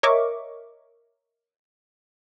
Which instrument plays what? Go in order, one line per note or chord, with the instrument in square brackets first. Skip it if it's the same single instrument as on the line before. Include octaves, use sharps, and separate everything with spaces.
[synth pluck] A#4 C#5 D#5 E5 C#6 D6